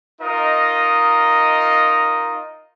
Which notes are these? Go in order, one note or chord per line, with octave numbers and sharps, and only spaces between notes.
D#4 F4 A#4 D#5